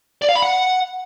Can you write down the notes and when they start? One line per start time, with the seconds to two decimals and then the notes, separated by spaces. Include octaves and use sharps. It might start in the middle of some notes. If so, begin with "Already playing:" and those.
0.22 D5
0.29 F5
0.36 B5
0.42 F#5